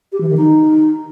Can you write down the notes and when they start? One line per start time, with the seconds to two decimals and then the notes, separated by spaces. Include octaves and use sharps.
0.12 G4
0.20 E3
0.29 D#3
0.37 D#4